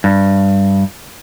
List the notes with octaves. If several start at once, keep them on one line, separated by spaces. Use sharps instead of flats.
G2